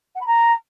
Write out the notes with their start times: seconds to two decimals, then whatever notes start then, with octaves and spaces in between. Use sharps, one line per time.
0.15 F#5
0.21 B5
0.26 A#5